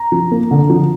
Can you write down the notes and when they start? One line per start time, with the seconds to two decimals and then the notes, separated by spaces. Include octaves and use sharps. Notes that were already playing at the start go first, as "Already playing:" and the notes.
Already playing: A#5
0.12 F3
0.31 A#3
0.51 D3
0.70 F3